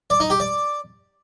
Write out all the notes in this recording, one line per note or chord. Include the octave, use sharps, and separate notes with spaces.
D5
D#4
G4
D5